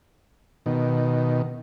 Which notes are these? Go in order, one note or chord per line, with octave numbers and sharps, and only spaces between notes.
B2 D#3